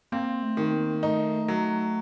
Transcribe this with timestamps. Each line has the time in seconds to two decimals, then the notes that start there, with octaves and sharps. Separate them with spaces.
0.12 A#3 C4
0.43 A3
0.57 D#3
0.72 A#3
1.03 A3 D#4
1.48 F#3